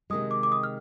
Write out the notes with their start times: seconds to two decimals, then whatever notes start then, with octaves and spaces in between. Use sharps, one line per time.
0.10 C3 D#3 G#3 D#6
0.31 D6
0.43 D6
0.52 D#6
0.63 F6